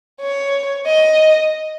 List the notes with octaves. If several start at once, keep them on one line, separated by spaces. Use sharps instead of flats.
C#5
D#5